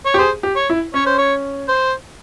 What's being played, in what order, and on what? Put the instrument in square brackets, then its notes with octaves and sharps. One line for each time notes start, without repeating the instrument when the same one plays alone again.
[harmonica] C#5
[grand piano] G4
[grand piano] G#4 [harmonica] C5
[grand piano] G4
[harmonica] C#5
[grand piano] E4
[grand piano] C#4 [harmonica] C#5
[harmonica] C5
C#5
C5